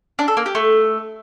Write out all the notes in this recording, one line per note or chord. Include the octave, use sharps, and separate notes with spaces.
D4
A4
A#3
G4
A3